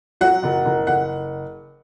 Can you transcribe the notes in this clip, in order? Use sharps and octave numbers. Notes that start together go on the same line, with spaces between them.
F#3 F#5
F#1
F#1
F#1 F#5